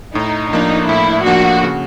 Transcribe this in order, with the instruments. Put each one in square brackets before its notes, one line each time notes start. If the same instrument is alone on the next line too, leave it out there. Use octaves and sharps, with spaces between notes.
[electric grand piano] A2 [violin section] D#4
[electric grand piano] F3 A#3 D4 [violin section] D#4
[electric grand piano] A2 [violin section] E4
[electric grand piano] F3 A#3 D4 [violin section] F#4
[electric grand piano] C#3